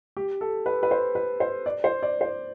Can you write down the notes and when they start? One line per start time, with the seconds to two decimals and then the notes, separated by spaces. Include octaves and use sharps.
0.17 G4
0.41 A4
0.66 B4
0.83 B4
0.91 C5
1.15 B4
1.40 C5
1.66 D5
1.84 C5
2.03 D5
2.21 C5